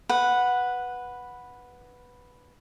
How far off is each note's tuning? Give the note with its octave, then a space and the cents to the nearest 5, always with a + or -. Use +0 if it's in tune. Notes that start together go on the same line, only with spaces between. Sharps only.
B4 +0 F#5 -10